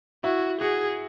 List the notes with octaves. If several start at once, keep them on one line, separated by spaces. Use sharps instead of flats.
E4 F#4
F#4 G#4